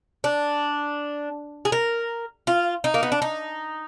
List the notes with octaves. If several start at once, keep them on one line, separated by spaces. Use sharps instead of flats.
D4
G#4
A#4
F4
D#4
A#3
B3
D4
D#4